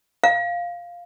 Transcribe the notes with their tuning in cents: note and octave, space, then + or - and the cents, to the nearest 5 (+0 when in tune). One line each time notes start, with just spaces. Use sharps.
F5 +0